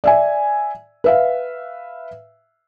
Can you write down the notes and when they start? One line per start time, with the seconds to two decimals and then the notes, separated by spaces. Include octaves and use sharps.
0.04 D5 E5 G#5
1.04 B4 E5 F5